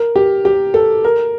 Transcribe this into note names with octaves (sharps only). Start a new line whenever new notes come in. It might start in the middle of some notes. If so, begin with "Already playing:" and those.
Already playing: A#4
G4
G4
A4
A#4